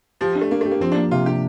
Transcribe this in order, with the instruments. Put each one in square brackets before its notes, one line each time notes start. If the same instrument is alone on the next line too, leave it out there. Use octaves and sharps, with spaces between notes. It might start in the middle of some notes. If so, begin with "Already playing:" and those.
[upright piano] F3 [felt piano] G4
[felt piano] D4
[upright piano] A3
[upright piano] A#3 [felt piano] D4
[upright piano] A3 [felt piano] G4
[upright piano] A#3
[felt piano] F3 [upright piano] C4
[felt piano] A#3 [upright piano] D4
[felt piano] C3 [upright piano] F4
[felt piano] D4 [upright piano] G4